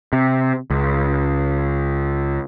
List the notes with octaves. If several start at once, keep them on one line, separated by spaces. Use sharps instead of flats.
C3
C#2